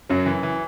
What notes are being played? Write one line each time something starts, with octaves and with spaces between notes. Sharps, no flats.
F#2 F#3
E3
E3